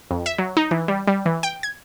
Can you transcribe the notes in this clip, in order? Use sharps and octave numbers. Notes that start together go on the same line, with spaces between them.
F2
E5
F#3
D#4
E3
G3
G3
E3
G5
G#6